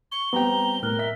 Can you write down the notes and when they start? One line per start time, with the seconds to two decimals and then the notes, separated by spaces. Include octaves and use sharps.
0.12 C#6 G7
0.33 G3 B3 C4 G4 G5 A#5
0.83 A2 A#4 F6 F#6
0.99 E5 B6